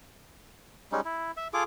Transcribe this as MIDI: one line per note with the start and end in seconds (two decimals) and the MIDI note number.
0.92 1.01 55
0.92 1.01 56
0.92 1.01 61
0.92 1.01 63
1.05 1.31 64
1.37 1.48 76
1.54 1.63 65
1.54 1.63 68
1.54 1.63 69
1.54 1.63 86